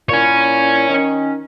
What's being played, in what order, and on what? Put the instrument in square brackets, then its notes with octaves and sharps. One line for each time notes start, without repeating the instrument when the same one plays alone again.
[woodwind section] A#2 E4 [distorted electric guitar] C#5 G#5
[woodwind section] D#3 C#4